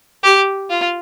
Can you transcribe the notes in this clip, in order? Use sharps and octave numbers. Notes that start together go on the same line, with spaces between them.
G4
F4